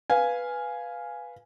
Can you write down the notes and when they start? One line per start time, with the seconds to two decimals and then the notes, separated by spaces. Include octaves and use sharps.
0.10 B4 F5 G#5